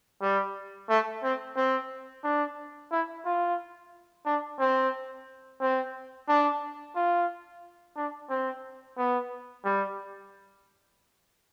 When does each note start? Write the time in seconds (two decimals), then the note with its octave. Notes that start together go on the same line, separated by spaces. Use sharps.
0.22 G3
0.90 A3
1.23 C4
1.56 C4
2.24 D4
2.91 E4
3.25 F4
4.26 D4
4.60 C4
5.61 C4
6.28 D4
6.95 F4
7.96 D4
8.30 C4
8.97 B3
9.65 G3